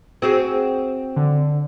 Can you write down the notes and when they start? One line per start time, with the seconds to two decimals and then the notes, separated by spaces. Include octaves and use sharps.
0.22 C4 F#4 G#4
1.16 D3